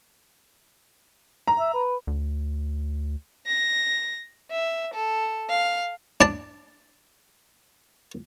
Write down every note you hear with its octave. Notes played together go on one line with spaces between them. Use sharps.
A#5
E5
B4
D2
A#6
E5
A4
F5
D4 A5